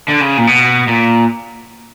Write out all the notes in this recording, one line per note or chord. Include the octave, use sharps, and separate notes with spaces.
D3
C#3
A#2
B2
A#2